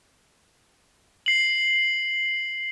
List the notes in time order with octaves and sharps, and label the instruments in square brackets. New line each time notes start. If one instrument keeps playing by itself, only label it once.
[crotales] C7 F#7